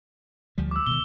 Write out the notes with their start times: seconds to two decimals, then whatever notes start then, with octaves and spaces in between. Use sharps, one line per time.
0.58 D2 F3 G3
0.71 D6 E6
0.86 B2 D#3 G7